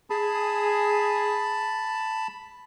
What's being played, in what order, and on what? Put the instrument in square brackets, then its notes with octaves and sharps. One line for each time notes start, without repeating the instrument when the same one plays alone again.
[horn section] G#4 [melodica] A5 B5